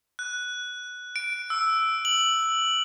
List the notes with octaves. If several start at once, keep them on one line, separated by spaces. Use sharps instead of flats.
F#6
D7
E6
F#7